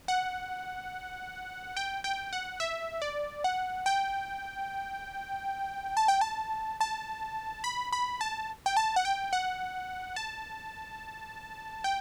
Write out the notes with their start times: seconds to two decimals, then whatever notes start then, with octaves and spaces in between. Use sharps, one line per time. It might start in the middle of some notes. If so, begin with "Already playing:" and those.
0.08 F#5
1.77 G5
2.04 G5
2.33 F#5
2.60 E5
3.02 D5
3.44 F#5
3.86 G5
5.97 A5
6.08 G5
6.21 A5
6.81 A5
7.64 B5
7.93 B5
8.21 A5
8.66 G5
8.77 A5
8.96 F#5
9.05 G5
9.33 F#5
10.16 A5
11.84 G5